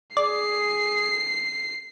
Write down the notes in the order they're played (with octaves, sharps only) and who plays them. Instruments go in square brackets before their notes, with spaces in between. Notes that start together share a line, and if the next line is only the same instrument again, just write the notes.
[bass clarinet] G#4 [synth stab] D5 [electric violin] C7